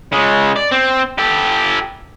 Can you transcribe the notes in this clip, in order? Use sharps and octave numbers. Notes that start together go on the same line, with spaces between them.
C#3 G#3
D5
C4
G4 A4